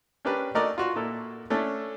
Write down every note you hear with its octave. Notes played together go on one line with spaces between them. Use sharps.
C#4 D4 G4 A#4 B4 D5
A3 D#4 F#4 A#4 D5 D#5
F4 F#4
A#2 E4 A4 A#4
A3 C#4 D4 E4 A4